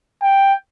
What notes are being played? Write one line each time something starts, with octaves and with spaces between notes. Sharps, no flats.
G5